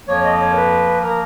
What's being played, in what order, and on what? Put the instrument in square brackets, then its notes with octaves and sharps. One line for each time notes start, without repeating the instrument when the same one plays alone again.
[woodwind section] F2 F3 A#3 C#5
D#5
C#5
A#4
B4
F3 A#3 A#4